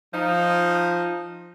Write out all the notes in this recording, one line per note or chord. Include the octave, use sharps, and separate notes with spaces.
F3 D#4